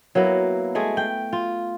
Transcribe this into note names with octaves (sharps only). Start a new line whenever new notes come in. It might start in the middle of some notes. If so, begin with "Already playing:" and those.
F#3 A#3 B3 E4
G#3 A3 G#4
G5
F4